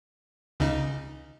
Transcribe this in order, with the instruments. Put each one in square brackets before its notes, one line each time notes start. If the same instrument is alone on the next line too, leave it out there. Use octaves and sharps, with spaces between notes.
[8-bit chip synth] C#2 C#3 D#4